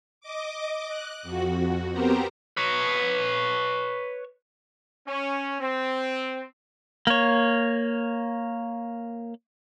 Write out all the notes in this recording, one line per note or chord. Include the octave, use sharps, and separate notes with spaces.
D#5 D6
F#6
F2 F#4
B3 C4 G4 A#4 C5 A#5
B4 C#5
C#4
C4
A#3 C#5